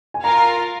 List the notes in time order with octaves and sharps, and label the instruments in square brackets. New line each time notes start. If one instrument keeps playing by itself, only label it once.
[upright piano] G#5
[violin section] F4 A#4 F5 [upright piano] A#5